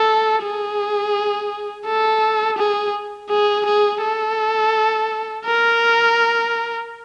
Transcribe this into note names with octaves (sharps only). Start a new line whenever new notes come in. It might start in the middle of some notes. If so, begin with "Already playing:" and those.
Already playing: A4
G#4
A4
G#4
G#4
G#4
A4
A#4